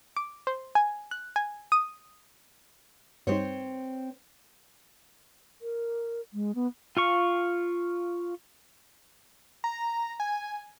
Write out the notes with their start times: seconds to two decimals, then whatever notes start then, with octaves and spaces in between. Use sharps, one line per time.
0.16 D6
0.47 C5
0.75 G#5
1.11 F#6
1.36 G#5
1.72 D#6
3.27 G2 G3 C4 D#4 C5 C#5
5.62 A#4
6.33 G#3
6.55 B3
6.97 F4 F5 C#6
9.64 A#5
10.20 G#5